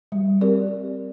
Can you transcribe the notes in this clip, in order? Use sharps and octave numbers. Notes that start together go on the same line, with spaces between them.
G3
C4 G4 A#4 D5